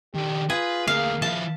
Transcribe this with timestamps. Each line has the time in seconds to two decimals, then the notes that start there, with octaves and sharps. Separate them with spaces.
0.14 D#3 D4 G4
0.50 F4 G#4 B4
0.87 D2 A#3 G#4 F5
1.22 F3 E4 A5